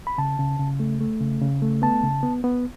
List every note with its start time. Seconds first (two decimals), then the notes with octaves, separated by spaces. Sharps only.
0.07 B5
0.18 C#3 A5
0.39 C#3
0.59 C#3
0.80 A3
1.01 A3
1.21 C#3
1.42 C#3
1.62 A3
1.82 B3 A5
2.03 C#3
2.23 B3
2.44 B3